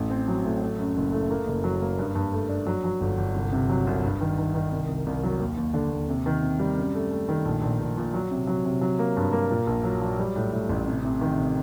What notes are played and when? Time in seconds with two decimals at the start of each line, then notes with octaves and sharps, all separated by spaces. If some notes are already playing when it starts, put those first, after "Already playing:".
Already playing: A1
0.10 C4
0.28 F#3
0.45 A2
0.62 A3
0.79 F#2
0.96 F#1
1.12 A3
1.30 A#3
1.46 F#1
1.64 F#3
1.82 A#3
1.99 G2
2.15 G2
2.32 A3
2.49 D4
2.67 F#3
2.84 F#3
3.01 G1
3.17 G1
3.34 C2
3.53 C3
3.70 F#3
3.87 C2
4.03 G2
4.21 D#3
4.38 D#3
4.55 D#3
4.72 C2
4.88 C2
5.06 C2
5.23 F#3
5.40 D#2
5.57 D#2
5.74 D3
5.92 D#2
6.09 C3
6.26 D#3
6.43 C3
6.59 G3
6.77 F#2
6.94 A3
7.11 A3
7.29 D#3
7.45 A#1
7.62 A#1
7.80 A#1
7.97 A#2
8.14 F#3
8.31 C3
8.47 F#3
8.65 C3
8.81 F#3
8.99 A#3
9.17 G2
9.33 A#3
9.50 A#2
9.67 A#1
9.84 F#3
10.02 F#3
10.19 G3
10.36 A2
10.52 A2
10.69 A1
10.87 C3
11.05 C3
11.21 D#3
11.38 C3